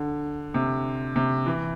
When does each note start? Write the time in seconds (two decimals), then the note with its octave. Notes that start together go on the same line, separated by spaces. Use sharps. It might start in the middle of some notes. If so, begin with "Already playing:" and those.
Already playing: D3
0.54 C3
1.16 C3
1.46 E3